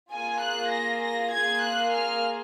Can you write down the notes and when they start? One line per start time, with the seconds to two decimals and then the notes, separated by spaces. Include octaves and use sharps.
0.11 A#3 F4 G#4 G#5
0.43 F#6
0.73 A#6
1.03 A#6
1.33 A#3 F4 G#4 G#6
1.64 F#6
1.94 F6